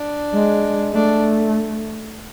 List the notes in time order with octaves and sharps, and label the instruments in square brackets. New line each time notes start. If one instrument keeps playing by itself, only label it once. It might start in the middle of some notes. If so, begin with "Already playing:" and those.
Already playing: [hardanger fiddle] D4
[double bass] G#3
[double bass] A3 [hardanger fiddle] D4